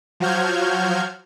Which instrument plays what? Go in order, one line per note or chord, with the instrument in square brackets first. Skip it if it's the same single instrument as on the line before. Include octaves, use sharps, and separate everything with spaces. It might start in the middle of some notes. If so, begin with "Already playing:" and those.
[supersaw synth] F3 F#3 F#4 F6 G6 G#6